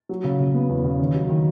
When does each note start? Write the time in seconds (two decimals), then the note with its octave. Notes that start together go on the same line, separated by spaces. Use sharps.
0.09 F#3
0.24 C#3
0.39 C#3
0.54 B3
0.69 E2
0.84 C#3
0.99 D#3
1.14 F#3
1.29 D#3